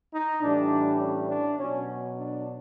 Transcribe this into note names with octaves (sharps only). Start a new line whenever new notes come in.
D#4
A2 E3 G3 D4
C#4
D4
B2 F#3 C#4
D4